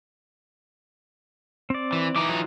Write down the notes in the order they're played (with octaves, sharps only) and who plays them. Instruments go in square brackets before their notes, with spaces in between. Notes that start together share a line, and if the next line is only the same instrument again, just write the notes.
[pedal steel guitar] C4 D5
[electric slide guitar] E3
[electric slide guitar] E3 D#4 [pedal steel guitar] D6
[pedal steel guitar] F#3 F4